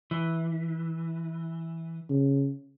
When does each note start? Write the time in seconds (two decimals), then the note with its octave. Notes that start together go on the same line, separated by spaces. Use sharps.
0.11 E3
2.10 C#3